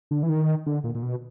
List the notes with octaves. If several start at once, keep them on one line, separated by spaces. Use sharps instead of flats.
D3
E3
D#3
D3
A#2
A#2
B2